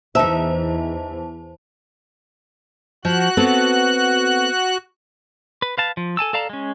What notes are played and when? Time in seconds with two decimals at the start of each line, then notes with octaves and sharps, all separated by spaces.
0.15 E2 E3 D#4 C5 E5 A5
3.05 F3 F#4 F#6
3.37 B3 C4 A4
5.62 B4
5.78 B4 F5 A5
5.97 F3
6.17 A4 G#5 A5 E6
6.33 A4 D5 F5 A5 A#5
6.50 G#3 C#4